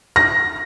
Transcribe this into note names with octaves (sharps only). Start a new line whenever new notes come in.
A#6